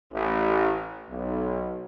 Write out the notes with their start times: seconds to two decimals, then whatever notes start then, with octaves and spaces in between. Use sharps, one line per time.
0.12 A1
1.10 B1